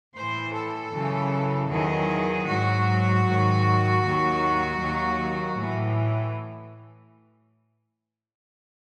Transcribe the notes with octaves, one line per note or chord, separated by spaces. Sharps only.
A2 E3 C5
A4
F#2 C#3 E3
E2 D#3 F#3 G#4
G#2 F#3 F#4
G#2 D#3 F#3
D#2 D#3 F#3
D#2 D#3 F#3
A2 E3